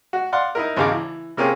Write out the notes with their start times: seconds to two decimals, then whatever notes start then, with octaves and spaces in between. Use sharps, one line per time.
0.13 F#4
0.32 D5 F5 F#5 C6
0.55 D#4 E4 A#4
0.77 G#1 E2 C#3 F5 A#5 D6
0.92 E3
1.37 C3 A#3 C#4 F4 G4 G#4